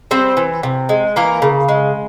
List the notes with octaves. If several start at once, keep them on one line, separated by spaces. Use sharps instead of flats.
G3 C4 C5
E3
C3
G#3
E3 A#3 A#4
C#3
G#3